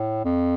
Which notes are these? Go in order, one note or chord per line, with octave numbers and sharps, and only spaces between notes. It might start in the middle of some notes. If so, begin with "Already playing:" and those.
Already playing: A2
F2